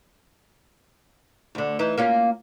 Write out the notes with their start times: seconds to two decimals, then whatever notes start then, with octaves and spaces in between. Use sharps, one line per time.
1.55 D2 D3
1.79 E3 D#4
1.98 A#3 C#4 F4